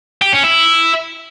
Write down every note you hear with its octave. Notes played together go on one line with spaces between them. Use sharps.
G4
C#4
E4